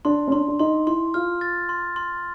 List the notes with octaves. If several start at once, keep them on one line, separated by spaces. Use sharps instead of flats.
D4 C6
C#4
D4 C6
D4
D#4 C6
E4 C6
F4 F6
A6
C6
C6